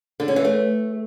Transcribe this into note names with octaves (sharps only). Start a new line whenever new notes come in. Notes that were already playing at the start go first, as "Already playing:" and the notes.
D3
C#4
E3
A3